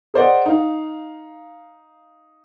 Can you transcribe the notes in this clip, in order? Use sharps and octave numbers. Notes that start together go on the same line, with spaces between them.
G#4 A#4 C5 D5 D#5 F#5
D#4 F5